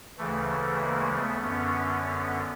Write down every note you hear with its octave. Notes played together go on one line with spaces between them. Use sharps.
D2 C#3 E3 A3
A3
G#3 A#3
A3 B3
F#2 D3 B3 C#4
B3 C#4